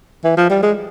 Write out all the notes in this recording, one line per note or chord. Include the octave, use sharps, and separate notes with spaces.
E3
F3
G3
G#3